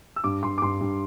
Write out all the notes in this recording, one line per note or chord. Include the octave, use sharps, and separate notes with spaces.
E6
G2 D6
G2 C6
D6
G2 C6
G2